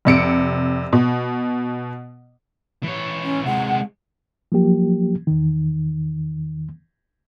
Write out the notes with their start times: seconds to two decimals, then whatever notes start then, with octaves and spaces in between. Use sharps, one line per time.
0.05 F1 C3 C#7 D7
0.93 B2
2.83 E3 C#5
3.23 C#4
3.45 C3 G#3 F#5
4.52 F3 F#3 A#3 G4
5.27 E2 D#3